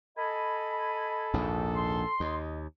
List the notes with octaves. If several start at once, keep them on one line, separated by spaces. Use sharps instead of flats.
A4 D#5 G#5 B5
A#1 D#2 G#2
C6
D#2 D#5